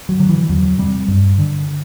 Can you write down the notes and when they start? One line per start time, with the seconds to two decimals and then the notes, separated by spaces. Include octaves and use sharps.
0.09 F#3
0.19 D3 F#3
0.29 E3
0.49 E2 F#3
0.78 C3 G3
1.08 G2
1.38 D3